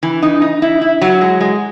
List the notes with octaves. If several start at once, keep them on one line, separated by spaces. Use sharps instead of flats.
E3
D#4
D#4
E4
E4
F#3
G#3
G#3